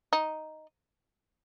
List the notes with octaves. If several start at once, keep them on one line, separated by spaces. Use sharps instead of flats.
D#4